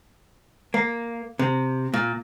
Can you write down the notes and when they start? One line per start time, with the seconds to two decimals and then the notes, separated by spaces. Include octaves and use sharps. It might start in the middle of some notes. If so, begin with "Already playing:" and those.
0.74 A#3
1.39 C3
1.94 A#2